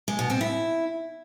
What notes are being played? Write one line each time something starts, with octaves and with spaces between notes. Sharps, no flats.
G#3
B2
C4
E4